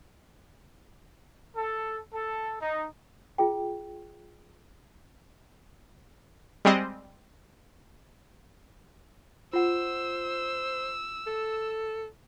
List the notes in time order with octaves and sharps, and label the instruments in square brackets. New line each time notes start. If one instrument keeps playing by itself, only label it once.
[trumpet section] A4
A4
D#4
[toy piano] F4 G#4 G5
[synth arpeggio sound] G3 G#3 C4 D#5
[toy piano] F4 F#5 [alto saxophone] C5 [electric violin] E6
[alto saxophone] A4